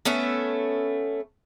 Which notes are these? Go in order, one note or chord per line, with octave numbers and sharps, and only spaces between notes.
A3 B3 C#4 E5